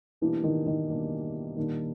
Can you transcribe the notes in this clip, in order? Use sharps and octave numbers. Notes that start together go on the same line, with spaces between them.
B2 E3 G3 A#3 D4 G4
D#3
D#3
B2 G3 A#3 D4 G4
A#2 D#3 G3 A#3 D4